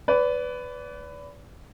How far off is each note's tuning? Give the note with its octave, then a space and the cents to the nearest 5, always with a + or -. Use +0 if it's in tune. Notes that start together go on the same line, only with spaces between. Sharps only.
B4 +15 D5 -30